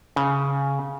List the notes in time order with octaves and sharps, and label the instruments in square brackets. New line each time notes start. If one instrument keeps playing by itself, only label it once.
[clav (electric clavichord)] C#3